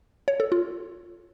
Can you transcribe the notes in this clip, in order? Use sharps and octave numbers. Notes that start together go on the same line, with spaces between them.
C#5
A4
F4